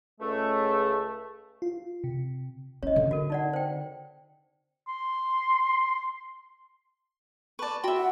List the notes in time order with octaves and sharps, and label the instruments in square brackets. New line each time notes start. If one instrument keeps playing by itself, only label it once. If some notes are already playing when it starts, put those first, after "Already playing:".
[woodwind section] C#2 A3
[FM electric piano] F4
C3
[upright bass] C#4 [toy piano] C#5 D#5
[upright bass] D3
[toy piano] F#4 A#4
D#4 D5 F#5
C5 G5
[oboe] C6
[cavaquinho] B4 D5 [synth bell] A5 C#6
[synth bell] F#4 G5 C6 [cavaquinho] E5 B5
[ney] F#5